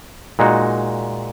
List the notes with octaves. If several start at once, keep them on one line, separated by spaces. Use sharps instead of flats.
A#2 G#3 D#4 F#4